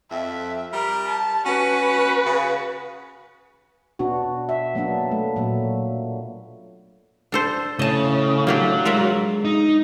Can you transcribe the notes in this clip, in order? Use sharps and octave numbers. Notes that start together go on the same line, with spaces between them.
F2 E5
G3 A#4
A5
C#4 F#4 B4
C#3
B2 B3 D4 F#4
E5
F#3 A#3 B3 D4
A3
A#2 F#3 A#3
D4 A4 C5
A2 C#3 D#5 A5
F#3 A#3 D4 G4
G#3 F4 A#4 E5
D#4